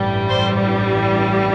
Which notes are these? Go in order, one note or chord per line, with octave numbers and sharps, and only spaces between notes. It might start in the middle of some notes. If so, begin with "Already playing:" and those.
Already playing: A1 G2 E3 G3
C5